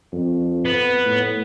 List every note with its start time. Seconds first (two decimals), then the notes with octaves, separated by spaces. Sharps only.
0.12 F2
0.65 B3
1.05 A2